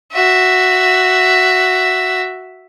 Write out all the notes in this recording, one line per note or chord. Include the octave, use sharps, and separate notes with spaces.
F#4 E5